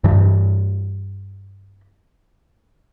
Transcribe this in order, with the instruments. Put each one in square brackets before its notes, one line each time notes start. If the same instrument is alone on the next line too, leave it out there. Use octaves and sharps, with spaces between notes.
[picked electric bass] G2 E3